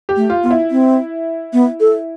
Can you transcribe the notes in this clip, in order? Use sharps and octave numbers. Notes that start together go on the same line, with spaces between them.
G4
A3
F4
B3 F4
E4
C4
B3
A4